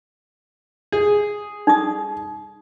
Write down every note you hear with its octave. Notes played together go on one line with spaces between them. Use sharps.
G#4
D#4 D#6